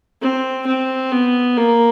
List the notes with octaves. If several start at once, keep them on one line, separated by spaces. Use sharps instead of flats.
C4
C4
B3
A#3